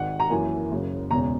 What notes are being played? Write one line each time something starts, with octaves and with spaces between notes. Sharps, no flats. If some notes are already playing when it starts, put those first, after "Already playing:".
Already playing: G#1 G#2 D#3 F#5
A#5
F#2 E3 A#3 G#5
F#1 F#2 C#3
E1 E2 C#3 G#3 A#5